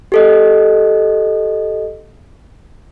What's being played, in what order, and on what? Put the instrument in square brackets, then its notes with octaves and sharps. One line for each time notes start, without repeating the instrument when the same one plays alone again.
[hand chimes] G4 A4 D#5